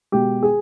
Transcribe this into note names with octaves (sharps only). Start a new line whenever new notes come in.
B2 G#3 G4
G#4